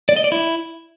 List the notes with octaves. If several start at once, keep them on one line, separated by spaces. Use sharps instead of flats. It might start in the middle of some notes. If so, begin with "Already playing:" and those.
D5
D#5
D5
E4